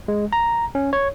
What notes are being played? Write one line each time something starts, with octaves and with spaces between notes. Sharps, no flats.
G#3
A#5
C#4
C#5